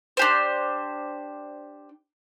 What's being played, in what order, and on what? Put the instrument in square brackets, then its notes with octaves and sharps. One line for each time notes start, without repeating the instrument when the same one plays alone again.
[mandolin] D4 G4 C5